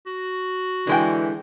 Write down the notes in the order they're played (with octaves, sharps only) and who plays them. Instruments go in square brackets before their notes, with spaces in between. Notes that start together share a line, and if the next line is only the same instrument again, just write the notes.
[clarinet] F#4
[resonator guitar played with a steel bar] D3 G#3 G5 [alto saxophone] E3